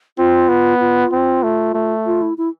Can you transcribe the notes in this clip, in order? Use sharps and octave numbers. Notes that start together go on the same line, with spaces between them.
C4 F4
B3
F4
C4
A3
A3
F4
E4
E4